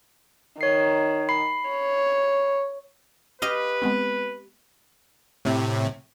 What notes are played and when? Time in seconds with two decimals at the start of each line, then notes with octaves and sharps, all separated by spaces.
0.61 D#3 C#5 C7
1.29 B5 C7
1.70 C#5
3.42 G4 B4 D#5 F5
3.82 G#3 B3 C4
5.45 A2 C3